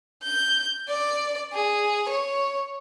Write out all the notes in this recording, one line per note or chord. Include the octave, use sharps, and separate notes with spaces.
G6
D5
G#4
C#5